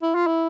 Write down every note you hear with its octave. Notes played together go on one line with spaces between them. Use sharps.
E4
F4
E4